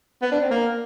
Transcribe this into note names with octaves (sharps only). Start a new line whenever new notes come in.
B3
D4
C4
A#3